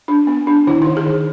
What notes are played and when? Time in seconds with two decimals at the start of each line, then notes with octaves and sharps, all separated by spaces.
0.08 D4
0.27 B3
0.47 D4
0.67 D#3 E4
0.82 D#4
0.87 D#3
0.97 G#4
1.06 D#3